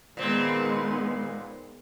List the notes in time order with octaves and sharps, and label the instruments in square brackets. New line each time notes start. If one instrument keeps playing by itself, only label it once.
[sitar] A#2 C4 [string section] D#3 G#3 B3